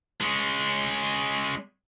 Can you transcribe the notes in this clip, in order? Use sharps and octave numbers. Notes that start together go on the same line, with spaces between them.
G#3 C#4